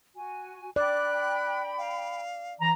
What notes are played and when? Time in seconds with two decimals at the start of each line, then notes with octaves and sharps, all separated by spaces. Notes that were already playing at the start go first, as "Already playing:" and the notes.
0.17 F#4 G#5
0.76 D5 G5 B5 F#6
1.78 F5
2.60 E3 A#5